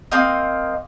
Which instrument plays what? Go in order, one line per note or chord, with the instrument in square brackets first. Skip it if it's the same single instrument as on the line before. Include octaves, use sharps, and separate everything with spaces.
[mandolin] A#3 C4 D#5